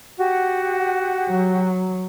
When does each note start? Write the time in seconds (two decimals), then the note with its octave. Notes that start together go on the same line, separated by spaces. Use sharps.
0.18 F#4 G4 F#5
1.29 F#3